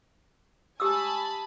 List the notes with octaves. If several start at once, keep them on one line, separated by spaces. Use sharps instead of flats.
G4 G#5 A5 B5 D#6 E6